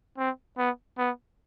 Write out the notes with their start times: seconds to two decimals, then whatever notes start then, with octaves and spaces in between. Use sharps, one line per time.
0.18 C4
0.58 B3
0.98 B3